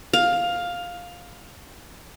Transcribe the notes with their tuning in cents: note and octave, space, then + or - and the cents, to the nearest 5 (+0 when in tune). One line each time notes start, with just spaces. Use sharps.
F5 +10